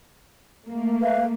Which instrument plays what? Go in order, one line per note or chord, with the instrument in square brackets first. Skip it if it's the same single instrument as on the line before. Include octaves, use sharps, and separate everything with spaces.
[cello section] A3 A#3
[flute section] B4 E5 F5